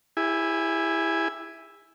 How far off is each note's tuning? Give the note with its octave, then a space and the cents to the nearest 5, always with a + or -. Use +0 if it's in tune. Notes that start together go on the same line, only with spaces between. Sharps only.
E4 +0 G4 +40 G#5 +0